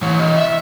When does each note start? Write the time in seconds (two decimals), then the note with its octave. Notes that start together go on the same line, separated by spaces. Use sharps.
0.02 E3 C#5
0.19 D#5
0.37 E5